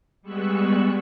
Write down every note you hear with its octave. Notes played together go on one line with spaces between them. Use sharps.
G3 G#3 B3 C#6 E6 F#6